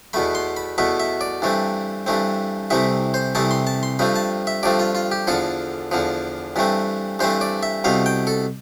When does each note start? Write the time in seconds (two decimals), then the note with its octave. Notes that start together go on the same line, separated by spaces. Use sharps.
0.13 E2 B2 A3 B5
0.35 C6
0.57 B5
0.78 E2 B2 A3 E5
1.00 E5
1.21 D5
1.42 G2 E3 A3 C4
2.06 G2 E3 A3 C4
2.70 C2 C3 E3 A3 C4 E5
3.14 C5
3.35 C2 C3 E3 A3 C4 A5
3.51 C6
3.67 A5
3.83 C6
3.99 G2 F3 A3 C4 B5
4.16 A5
4.47 E5
4.63 G2 F3 A3 C4 D5
4.79 F4
4.95 F4
5.11 G4
5.27 E2 D3 F3 A4
5.91 E2 D3 F3
6.56 G2 E3 A3 C4
7.19 G2 E3 A3 C4 C5
7.41 D5
7.63 E5
7.84 C2 B2 A3 C4 F5
8.06 G5
8.27 A4